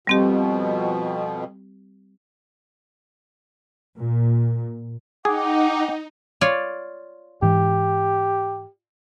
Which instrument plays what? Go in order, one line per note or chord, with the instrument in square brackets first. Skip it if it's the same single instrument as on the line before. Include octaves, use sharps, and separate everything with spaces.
[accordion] F2 B2 [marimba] G3 C4 G4
[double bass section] A#2
[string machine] D#4 [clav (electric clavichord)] G#4 [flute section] F#5 G5 D6
[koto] F4 C#5 D5
[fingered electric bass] G#2 E3 [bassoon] G4